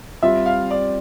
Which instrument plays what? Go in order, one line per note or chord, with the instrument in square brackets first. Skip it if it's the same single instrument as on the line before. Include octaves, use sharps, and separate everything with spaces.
[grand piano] G3 C4 F4 [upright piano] E5
[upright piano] F5
D5